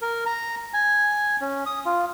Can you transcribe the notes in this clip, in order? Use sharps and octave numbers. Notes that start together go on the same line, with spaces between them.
A#4
A#5
G#5
C#4
D#6
F4